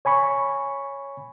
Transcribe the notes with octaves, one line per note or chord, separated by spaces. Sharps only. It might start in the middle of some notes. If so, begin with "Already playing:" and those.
C#5 G#5 B5 C#6